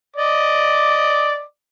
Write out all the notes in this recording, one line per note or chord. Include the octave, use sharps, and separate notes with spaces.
D5 D#5 D6